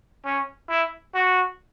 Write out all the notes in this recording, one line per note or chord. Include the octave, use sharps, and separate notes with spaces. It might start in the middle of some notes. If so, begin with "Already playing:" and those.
C#4
E4
F#4